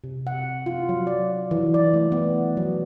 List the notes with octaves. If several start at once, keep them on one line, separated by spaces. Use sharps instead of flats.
C3
F#5
F4
F#3
D5
E3
D5
A3
B3
F#3